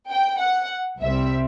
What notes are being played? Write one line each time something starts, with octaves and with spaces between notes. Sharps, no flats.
G5
F#5
C2 C3 G3 C4 E5